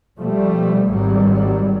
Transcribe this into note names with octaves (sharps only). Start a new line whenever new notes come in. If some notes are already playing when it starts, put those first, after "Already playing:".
B2 F3 G3 A3
G#1 G#2 F#3 G3